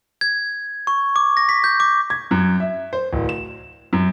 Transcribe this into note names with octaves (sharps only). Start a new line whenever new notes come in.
G#6
C#6
D6
A#6
B6
G6
D6
G#6
F#2
E5
C5
D1
E7
F#2